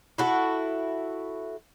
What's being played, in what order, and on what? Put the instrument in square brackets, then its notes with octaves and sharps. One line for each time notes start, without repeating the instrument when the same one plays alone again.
[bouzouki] E4 F#4 A4